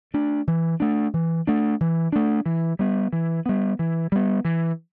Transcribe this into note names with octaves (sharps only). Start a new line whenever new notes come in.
A3 D4
E3
A3 D4
E3
A3 D4
E3
A3 D4
E3
G3 B3
E3
G3 B3
E3
G3 B3
E3